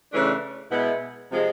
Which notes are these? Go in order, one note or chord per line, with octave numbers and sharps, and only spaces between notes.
C#3 E3 A3 D4
B2 G#3 B3 E4
C3 F3 G#3